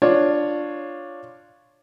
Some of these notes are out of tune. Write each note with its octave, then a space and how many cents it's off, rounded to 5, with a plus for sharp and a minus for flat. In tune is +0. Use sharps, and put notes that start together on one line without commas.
D4 +5 F4 +0 C#5 +0